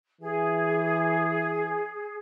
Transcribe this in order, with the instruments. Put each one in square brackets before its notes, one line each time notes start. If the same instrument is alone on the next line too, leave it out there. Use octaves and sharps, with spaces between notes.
[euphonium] E3 [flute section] G#4